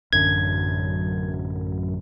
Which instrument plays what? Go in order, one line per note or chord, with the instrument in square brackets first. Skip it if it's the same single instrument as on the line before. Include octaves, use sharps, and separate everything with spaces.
[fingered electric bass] A1 D3 [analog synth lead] F#2 [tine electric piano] G#6